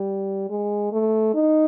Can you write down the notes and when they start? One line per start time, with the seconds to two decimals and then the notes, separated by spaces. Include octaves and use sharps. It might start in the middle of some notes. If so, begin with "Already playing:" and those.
Already playing: G3
0.50 G#3
0.92 A3
1.34 D#4